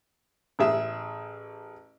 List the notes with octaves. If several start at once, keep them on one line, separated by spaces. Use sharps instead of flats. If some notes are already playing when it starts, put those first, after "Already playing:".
A1 G#4 E5